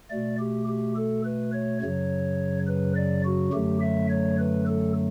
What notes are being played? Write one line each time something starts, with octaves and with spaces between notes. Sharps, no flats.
B2 A3 D5
G4
G4
A4
B4
C#5
F#2 C#3 F#3 C#5
B4
D5
F#4
F#2 D3 F#3 A3 G4
E5
C#5
B4
A4